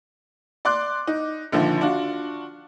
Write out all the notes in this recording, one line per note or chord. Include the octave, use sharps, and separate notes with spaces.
D5 C6 D6 F#6
D#4
A#1 D3 D#3 F3
D4 F4 F#4